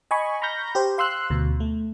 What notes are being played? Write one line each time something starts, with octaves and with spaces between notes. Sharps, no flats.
D#5 G#5 B5 C#6
A#5 B5 C#6 F6 G6 A#6
G4 C5
F5 C6 E6 F#6
D2 B2
A3